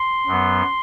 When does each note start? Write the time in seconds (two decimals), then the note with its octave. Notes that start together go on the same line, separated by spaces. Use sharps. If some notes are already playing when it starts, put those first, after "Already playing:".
Already playing: C6
0.27 F#2 F#3 B3